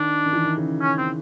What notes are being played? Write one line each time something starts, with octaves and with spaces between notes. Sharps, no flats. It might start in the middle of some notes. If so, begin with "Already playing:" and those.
Already playing: D#3 D4
D#3
E3
D#3
C#3
C#4
C4